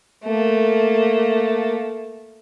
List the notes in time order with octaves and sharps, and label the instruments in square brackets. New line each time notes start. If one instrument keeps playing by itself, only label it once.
[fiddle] A3 A#3